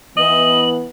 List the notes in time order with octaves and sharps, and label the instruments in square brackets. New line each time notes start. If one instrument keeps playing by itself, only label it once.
[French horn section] E3 B3 [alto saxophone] D#5 [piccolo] F#7